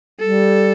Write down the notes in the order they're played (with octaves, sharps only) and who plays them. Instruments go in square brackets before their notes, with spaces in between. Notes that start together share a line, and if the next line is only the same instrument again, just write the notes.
[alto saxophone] G3 [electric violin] A4